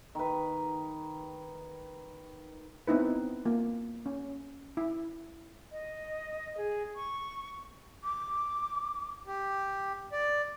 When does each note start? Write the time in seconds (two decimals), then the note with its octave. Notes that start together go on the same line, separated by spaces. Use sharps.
0.15 D#3 B4
2.87 B3 C4 D#4 E4 B4
3.46 A#3 F4
4.06 C#4
4.77 E4
5.72 D#5
6.57 G#4
6.96 C#6
8.04 D6
9.27 G4
10.12 D5